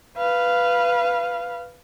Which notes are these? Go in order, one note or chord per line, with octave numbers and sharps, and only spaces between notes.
B4 F5